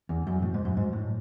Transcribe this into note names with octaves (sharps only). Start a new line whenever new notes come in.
E2
F#2
A2
G#2
F#2
G#2
A2